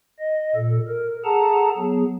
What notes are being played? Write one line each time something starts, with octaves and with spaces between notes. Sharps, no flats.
D#5
A#2 A4
A#4
G#4 A4 F#5 A5 A#5
F#3 B3 G#4